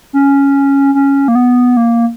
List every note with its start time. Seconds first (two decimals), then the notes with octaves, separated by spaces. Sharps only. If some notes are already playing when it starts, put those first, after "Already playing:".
0.13 C#4
0.95 C#4
1.28 A#3
1.35 B3
1.77 A#3